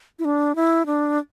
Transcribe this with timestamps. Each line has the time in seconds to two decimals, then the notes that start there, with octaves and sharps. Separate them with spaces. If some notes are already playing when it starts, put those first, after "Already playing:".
0.19 E4
0.25 D4
0.56 E4
0.86 D4